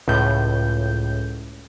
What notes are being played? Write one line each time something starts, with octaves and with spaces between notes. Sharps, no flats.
C#2 A2 G6